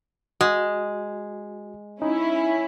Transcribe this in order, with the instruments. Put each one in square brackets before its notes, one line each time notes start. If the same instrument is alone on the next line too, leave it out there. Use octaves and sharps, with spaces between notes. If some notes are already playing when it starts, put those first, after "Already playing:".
[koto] G#3 [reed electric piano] F#4
[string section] C#4 E4 [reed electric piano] D#4